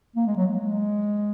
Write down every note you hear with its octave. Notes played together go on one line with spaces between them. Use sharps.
A#3
G#3
F#3
G#3